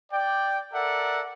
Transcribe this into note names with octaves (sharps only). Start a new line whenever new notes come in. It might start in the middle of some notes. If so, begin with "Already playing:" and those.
D5 G5
A4 A#4 D5 E5 F#5